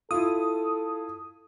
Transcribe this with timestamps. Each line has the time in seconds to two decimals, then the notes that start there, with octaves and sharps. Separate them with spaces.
0.11 E4 F4 A4 D#6